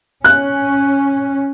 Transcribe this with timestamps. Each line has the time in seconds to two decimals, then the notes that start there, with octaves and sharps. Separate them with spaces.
0.24 C#4 F#6